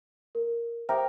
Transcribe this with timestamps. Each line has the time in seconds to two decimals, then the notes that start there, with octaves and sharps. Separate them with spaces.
0.35 A#4
0.89 G4 A#4 C5 E5 G5